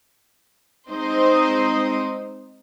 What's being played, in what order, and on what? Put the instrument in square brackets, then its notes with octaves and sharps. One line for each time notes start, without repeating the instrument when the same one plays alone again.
[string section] G#3 C4 D#4 C5 D#5